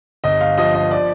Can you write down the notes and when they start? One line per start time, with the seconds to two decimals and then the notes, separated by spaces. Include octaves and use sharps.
0.24 G1 D#5
0.41 F5
0.58 F3 D#5
0.75 D#5
0.91 D5